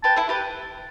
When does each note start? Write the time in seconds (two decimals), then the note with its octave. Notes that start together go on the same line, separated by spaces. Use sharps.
0.04 G4 B4 A5
0.16 E4 A4
0.29 G4 B4